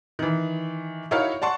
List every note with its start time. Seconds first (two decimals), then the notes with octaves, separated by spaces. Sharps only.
0.19 D#3 E3
1.11 D#4 E4 F#4 A#4 C#5 F5
1.42 D5 F#5 A5 C6 C#6